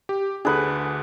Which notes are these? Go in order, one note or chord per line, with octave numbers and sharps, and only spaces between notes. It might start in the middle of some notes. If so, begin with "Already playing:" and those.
G4
D2 D3 D4 G#4 B4